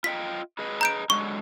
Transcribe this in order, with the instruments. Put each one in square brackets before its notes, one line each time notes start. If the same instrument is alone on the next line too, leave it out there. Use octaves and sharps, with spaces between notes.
[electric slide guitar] F4 D#5 G5 [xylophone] B6
[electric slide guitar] G#4 B4 D#5
[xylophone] A#5 G6 D7
[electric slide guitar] D3 F#3 G#3 [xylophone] C#6